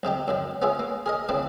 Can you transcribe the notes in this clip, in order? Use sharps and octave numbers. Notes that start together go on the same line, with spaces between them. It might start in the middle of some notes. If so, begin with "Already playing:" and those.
B1 C3 D#4 G4
F#2 D3 D#3
B3 C#4 F4 G#4 E5
A#3
G#4 A#4 D#5
D#2 C#3 E3 C4 D4 E4